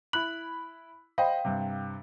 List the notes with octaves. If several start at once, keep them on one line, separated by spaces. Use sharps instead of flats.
E4 B5 F#6 F#7
C5 D#5 F5 G5 B5
G2 C3